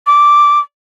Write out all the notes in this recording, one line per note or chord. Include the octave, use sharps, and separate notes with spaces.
D6